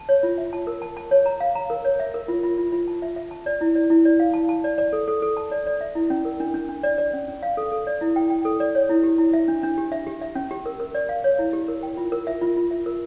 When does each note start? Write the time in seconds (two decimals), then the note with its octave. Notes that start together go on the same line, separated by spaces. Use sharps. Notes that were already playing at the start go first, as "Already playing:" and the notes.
Already playing: A5
0.09 C#5
0.23 F4
0.38 E5
0.53 A5
0.67 A#4
0.82 A5
0.97 A5
1.11 C#5
1.26 A#5
1.40 F5
1.55 A#5
1.70 A#4
1.85 C#5
2.00 E5
2.14 A#4
2.28 F4
2.43 F4
2.58 F4
2.72 F4
2.88 A5
3.02 E5
3.16 E5
3.31 A5
3.46 D5
3.61 E4
3.75 D5
3.90 E4
4.05 D5
4.20 F5
4.34 A5
4.49 A5
4.64 D5
4.78 D5
4.93 A4
5.08 A4
5.22 A4
5.37 A5
5.52 D5
5.67 D5
5.81 E5
5.95 E4
6.10 C#4
6.25 A#4
6.40 D4
6.54 D4
6.69 D4
6.83 D5
6.98 D5
7.13 C#4
7.28 C#4
7.43 F5
7.57 A4
7.72 A4
7.87 D5
8.01 E4
8.16 G5
8.30 G5
8.45 A4
8.60 D5
8.75 C#5
8.89 E4
9.04 G4
9.18 E4
9.33 E5
9.48 D4
9.63 D4
9.78 G4
9.92 E5
10.07 G4
10.22 E5
10.35 C#4
10.51 G4
10.66 A#4
10.80 A#4
10.95 D5
11.09 F5
11.24 C#5
11.39 E4
11.53 G4
11.68 A#4
11.83 G5
11.97 F4
12.12 A#4
12.27 E5
12.41 F4
12.56 F4
12.71 E5
12.86 A#4